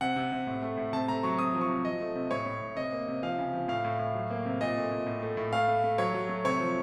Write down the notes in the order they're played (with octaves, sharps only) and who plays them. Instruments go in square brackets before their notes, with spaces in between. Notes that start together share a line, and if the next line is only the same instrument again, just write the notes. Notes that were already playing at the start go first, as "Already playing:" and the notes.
[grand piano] C3 F#5
C3
C3
A2
A3
A2
C3 A5
A3 A#5
F#3 C#6
C3 D#6
F3
C#6
C3
F3 D#5
A3
C3
A2 C#5
A2
A2
C3 D#5
A#3
C3
F3 F5
C#3
F3
A2 F5
A2
A2
F#3
A#3
C3
A#2 D#5
A3
A#2
A2
A3
A2
A3 F5
A3
A3
F#3 C#5
F#3
A3
C3 C#5
F3